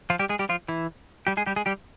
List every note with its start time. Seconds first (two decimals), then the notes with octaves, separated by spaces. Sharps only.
0.10 F3 F4
0.19 G3 G4
0.29 G#3 G#4
0.39 G3 G4
0.49 F3 F4
0.68 E3 E4
1.27 G3 G4
1.37 G#3 G#4
1.46 G3 G4
1.56 G#3 G#4
1.66 G3 G4